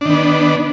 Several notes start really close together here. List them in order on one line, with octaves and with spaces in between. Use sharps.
D4 D#3 B3